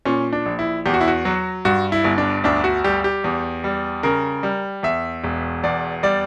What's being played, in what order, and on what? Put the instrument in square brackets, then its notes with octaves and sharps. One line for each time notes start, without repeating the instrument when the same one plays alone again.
[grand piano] A#2 C#4
D4
A#1
E4
E2 G4
F#4
E4
F#4
F#3
G2 F#4
E4
G1
D4
D2 D4
F#4
G3 G4
G4
E2
G3
C#3 A#4
G3
E2 E5
E1
E2 D5
G3 D5